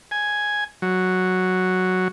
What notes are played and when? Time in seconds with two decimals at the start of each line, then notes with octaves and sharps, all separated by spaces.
0.11 G#5
0.82 F#3